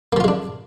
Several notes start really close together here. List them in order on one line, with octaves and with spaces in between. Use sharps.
A#3 F3 F4 G#3 D4